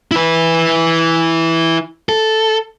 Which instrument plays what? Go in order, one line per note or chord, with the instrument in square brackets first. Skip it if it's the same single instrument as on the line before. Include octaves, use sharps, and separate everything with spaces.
[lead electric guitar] E4 B4
A4